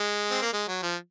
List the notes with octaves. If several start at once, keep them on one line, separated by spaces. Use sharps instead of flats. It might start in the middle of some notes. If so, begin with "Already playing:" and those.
Already playing: G#3
C4
A#3
G#3
F#3
F3